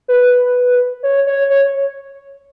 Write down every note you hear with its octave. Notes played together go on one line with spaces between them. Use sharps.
B4
C#5
C#5
C#5